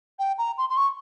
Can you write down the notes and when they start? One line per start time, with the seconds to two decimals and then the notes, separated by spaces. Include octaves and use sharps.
0.19 G5
0.38 A#5
0.58 C6
0.69 C6
0.77 C#6